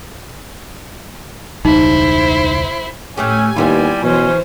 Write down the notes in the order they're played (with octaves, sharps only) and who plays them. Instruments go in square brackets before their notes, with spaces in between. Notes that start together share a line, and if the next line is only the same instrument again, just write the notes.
[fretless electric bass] E1 C#2 G3 [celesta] D#4 [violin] E4 C5
[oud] A2 A3 G4 [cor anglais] C#4 [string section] G#5
[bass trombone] D#2 [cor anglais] G3 [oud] B3 E4 F4
[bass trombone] B2 [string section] E3 C5 C#5 [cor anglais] C#4